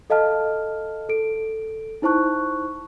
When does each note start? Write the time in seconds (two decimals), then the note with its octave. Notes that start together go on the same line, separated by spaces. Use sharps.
0.10 A4 D#5 F5 A5 F6
1.09 A4 D7
2.02 D#4 E4 C5 A5 C#6 F#6